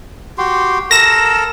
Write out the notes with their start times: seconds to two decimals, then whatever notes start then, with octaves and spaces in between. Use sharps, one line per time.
0.38 F#4 G4 C6
0.91 A4 A#4 A#6 E7